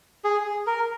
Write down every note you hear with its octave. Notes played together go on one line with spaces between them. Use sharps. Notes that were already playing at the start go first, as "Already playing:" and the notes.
G#4
A#4